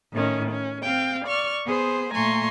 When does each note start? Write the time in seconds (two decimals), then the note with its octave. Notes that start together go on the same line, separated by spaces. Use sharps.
0.11 A2 D#3 C#4
0.51 C#4
0.82 C4 F5 G5
1.25 D5 C#6 F6
1.65 B3 G#4 C5
2.14 A#2 A3 G#5 A#5 C6 C#6